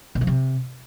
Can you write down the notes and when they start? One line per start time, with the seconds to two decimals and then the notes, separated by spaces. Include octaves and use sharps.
0.15 B2
0.21 F3
0.27 C3